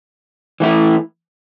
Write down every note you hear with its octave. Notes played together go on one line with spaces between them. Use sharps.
E3 A3 E4